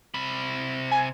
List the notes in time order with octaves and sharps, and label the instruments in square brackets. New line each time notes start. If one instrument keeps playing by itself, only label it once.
[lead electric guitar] C3 B5
[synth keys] G#5